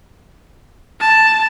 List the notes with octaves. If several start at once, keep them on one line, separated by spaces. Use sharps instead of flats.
A5